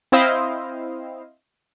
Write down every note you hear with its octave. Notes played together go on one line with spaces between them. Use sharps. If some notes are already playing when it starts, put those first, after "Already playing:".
C4 E4 C5 D#5 F5